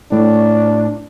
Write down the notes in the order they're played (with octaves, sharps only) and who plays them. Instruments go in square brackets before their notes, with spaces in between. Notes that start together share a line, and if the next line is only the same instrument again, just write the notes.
[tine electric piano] A2 [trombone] D4